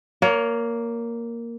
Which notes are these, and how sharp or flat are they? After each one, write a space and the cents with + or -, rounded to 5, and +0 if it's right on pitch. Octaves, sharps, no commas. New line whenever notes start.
A#3 +0 C#5 +30